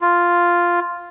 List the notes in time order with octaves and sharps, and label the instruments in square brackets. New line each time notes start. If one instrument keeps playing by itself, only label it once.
[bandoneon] F4